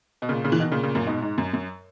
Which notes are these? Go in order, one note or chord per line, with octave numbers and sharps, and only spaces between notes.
B2
A#2 C#3
A#2 C#3
E3
B2 D#3
A#2 C#3
A#2 C#3
F#2 A#2
G#2 B2
G#2
F#2
F#2